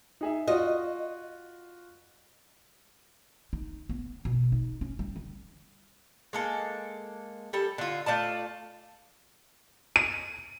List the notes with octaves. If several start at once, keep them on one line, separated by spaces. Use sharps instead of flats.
D#4 G#4 E5
F4 F#4 D#5
D#4
B3
B2
D#4
C#4
G3
D3
G#3 A#3 A4
G3 A4
D3 F4
A3 F4 D5 A5
D#7